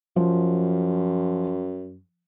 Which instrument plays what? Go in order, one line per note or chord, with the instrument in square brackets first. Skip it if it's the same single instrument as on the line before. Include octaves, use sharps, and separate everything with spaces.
[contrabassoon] F#2 [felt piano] F3